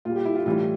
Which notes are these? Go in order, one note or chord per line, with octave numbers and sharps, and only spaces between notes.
A#2 G3 F4
G4
E4
F4
A2 E3 G3 F4